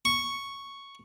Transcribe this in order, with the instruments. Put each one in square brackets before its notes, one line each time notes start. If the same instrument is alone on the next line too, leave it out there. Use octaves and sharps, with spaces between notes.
[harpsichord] C#6